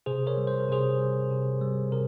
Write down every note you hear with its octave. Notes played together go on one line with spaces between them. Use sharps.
C3 G#4 C5
A#4 C#5
G3
C5
A#4
C3 G#4 C5
G3
C3
G3
C3 A#4